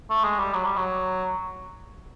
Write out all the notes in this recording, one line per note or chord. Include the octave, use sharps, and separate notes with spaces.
A3
G#3
G3
F#3
G3
F#3